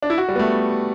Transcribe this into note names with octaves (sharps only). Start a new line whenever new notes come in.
D4
E4
F#4
G3
B3
A3